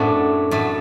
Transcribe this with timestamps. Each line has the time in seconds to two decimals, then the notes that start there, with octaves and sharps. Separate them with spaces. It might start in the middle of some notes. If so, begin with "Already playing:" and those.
Already playing: F#2 A2 F#3 A3 C4 D4
0.51 A2 F#3 A3